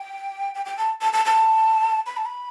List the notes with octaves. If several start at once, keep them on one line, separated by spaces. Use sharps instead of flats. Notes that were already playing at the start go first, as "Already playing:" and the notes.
Already playing: G5
G5
G5
A5
A5
A5
A5
B5
A5
B5